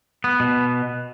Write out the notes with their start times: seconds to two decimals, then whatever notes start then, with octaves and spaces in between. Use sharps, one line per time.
0.24 B3
0.40 B2